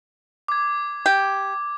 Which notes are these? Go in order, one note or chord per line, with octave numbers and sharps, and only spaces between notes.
D6 G#6
G4